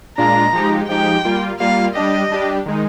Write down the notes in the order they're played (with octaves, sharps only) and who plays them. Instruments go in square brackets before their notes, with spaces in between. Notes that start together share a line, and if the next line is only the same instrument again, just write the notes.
[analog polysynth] A#2 G#3 D4 F4 [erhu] A#5
[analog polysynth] F3 G#3 D#4 G4
[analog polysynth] F3 G#3 D#4 G4 [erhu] G5
[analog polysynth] G3 A#3 F4
[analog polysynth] G3 A#3 F4 [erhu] F5
[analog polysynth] G3 D4 G4 [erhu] D#5
[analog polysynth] G3 D4 G4
D#3 G#3 D#4